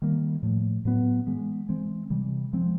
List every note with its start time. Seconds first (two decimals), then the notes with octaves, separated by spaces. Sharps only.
0.02 D#3 G3 A#3
0.43 A2 F3 A3
0.85 A2 F#3 B3
1.27 E3 G#3 B3
1.69 E3 G#3 C4
2.10 C3 E3 G3
2.53 F3 G#3 C4